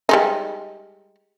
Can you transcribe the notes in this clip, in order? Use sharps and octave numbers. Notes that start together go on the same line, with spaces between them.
G3 G#3 D#4